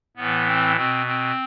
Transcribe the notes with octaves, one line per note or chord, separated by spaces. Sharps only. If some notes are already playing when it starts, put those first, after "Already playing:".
A2 E3 B3
C4
B2 C4
C4